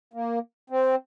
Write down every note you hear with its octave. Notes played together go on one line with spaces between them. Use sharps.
A#3
C4